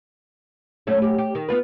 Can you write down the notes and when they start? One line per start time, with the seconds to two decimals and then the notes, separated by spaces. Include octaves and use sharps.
0.87 F#2 A3 C#4
1.02 F#2 G4
1.18 G4
1.35 D#3
1.48 B3 F4 B4